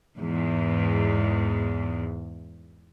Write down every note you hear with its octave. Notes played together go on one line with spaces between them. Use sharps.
E2 G#2